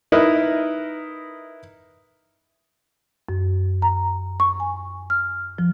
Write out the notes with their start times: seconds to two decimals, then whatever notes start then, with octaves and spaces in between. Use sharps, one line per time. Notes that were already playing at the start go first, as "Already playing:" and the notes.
0.12 D#4 E4 A#4 B4 D#5
3.29 F#2
3.82 A#5
4.40 C#6
4.60 G#5
5.10 F6
5.58 F3